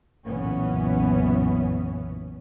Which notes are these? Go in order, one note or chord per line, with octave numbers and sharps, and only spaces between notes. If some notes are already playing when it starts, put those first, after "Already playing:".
F#1 B1 A#2 E3 B3 C#4